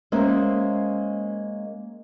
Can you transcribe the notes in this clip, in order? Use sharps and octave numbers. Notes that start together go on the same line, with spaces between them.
G#3 A#3 C#4 C5 D#5 E5